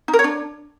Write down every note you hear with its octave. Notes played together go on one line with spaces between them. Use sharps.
D#4
A#4
C#5
D4